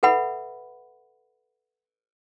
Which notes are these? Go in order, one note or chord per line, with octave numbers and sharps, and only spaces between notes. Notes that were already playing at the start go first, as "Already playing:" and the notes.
A4 B4 E5 F#5 B5